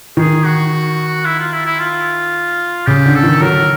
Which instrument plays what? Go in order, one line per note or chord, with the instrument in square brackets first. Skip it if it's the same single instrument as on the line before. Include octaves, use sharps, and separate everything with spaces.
[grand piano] D#3 [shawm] G#4
[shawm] F#4
E4
F4
E4
E4
F4
[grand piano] C#3 [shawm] G4
[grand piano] D3
[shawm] A4
[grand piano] D#3
[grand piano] F#3 [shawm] A#4